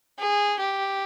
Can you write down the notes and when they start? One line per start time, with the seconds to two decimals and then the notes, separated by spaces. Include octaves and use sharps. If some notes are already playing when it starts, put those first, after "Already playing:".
0.19 G#4
0.60 G4